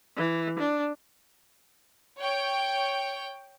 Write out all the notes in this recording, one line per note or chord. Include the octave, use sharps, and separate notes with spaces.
E3
D4
C#5 G5